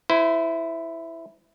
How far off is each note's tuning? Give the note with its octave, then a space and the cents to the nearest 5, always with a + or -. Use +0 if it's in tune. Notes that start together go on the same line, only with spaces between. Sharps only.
E4 +0 C5 -35